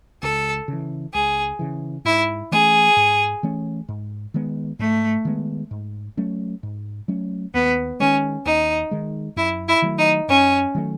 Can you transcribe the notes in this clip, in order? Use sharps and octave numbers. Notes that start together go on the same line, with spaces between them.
C#2 A4
C#3 E3
C#2 G#4
C#3 E3
G#2 E4
E3 A3 C#4 G#4
G#2
E3 A3 C#4
G#2
D#3 G#3 B3
G#2 A3
D#3 G#3 B3
G#2
F#3 A3 C#4
G#2
F#3 A3 C#4
D#2 B3
D#3 G#3 C#4
D#2 D#4
D#3 G#3
F#2 E4
E4
D#3 F#3 A3
D#4
F#2 C#4
D#3 F#3 A3